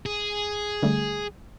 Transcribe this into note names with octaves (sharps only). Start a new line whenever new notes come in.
G#4
D3 G3 A3